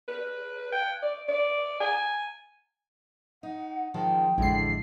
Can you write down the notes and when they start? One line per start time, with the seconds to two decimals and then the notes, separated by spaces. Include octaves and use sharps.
0.08 B4
0.72 G5
1.02 D5
1.28 D5
1.81 G#5
3.43 D#4 F#5
3.94 D#3 F3 G#3 G5
4.38 A1 F2 D3 G#3 E4 C7